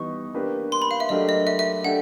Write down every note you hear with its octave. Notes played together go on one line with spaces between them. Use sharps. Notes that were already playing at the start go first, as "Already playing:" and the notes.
Already playing: E3 G3 B3 D#4 C#6
A#3 D4 G4 B4
C6
B5
F5
E5
F#3 A3 D4 G4 A#4 D#5
D#5
E5
E5
A3 D4 G4 F#5